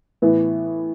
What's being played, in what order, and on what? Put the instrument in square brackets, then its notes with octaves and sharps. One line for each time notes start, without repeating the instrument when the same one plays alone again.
[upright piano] A2 E3 B3